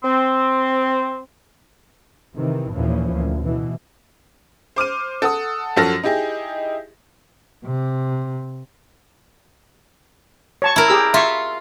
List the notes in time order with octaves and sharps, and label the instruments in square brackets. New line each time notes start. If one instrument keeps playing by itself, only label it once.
[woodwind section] C4
[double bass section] C3 D#3 E3
D#2 A#2 E3 F3 C#4
D2 A#2
B2 E3
[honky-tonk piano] C5 D6 F6 D#7
A4 F#5 D#6
F#2 F3 F#4 A4 F6 A#6
D#4 E4 G4 G#4 D#5
[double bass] C3
[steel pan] C#5 A5 C#6
[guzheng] E4 A#4
[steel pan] G4 G#4 E6
[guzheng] F4 [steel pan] E5 C#6